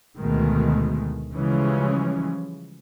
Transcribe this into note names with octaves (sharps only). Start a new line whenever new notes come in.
D2 B2 D#3 G#3 A3
C#3 E3 F3 G3 G#3 C#4